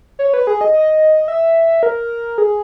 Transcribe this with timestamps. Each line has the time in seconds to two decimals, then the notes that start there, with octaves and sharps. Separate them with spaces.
0.19 C#5
0.34 B4
0.47 G#4
0.61 D#5
0.73 D#5
1.28 E5
1.83 A#4
2.38 G#4